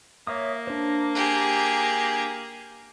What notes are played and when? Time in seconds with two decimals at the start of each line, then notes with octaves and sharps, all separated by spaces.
0.27 A#3 C#5 E5 D#6
0.67 D4 C5
1.15 G4 G#4